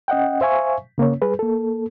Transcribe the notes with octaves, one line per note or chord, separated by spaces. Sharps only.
C#4 D#5 F#5 G5
C5 E5 F5 G#5 C#6
C#3 A#3 C#4 C#5
G3 G#4 B4
A#3 A4